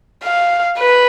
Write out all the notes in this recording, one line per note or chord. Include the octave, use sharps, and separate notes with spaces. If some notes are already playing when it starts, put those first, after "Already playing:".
F5
B4